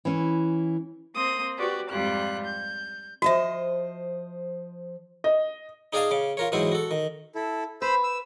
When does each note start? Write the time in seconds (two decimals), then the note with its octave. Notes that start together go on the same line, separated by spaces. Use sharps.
0.05 E3 C#4
1.15 A#3 C4 C6 D#6
1.58 F#4 G4 B4 D5
1.91 F2 G#2 G3 F4 G4 F#6
2.46 G6
3.22 F3 F#4 C5 D#5 E5
5.24 D#5
5.93 D#4 G#4 D5 F5 G#5 A5
6.11 C#3 D6
6.37 F4 A#4 C#5
6.52 G#2 E3 F#3 E4 C5
6.72 F#4 A4
6.91 D#3
7.35 E4 A4
7.82 B4 C5 B5 E6
8.04 E6